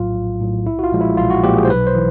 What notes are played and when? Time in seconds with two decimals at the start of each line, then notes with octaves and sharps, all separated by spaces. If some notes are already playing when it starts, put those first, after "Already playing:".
Already playing: A#1 A2 F#3 F4
0.14 A#1
0.40 A2 F#3
0.66 B1 E4
0.79 F#4
0.84 F4
0.92 A#2 F3 G#3
1.01 E4
1.17 B1 F4
1.30 F#4
1.43 A#2 F3 G#3 G4
1.57 G#4
1.65 C5
1.69 B1 B4
1.87 C5
1.95 E3